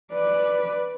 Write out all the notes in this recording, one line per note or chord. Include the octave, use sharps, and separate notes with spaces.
B4 D5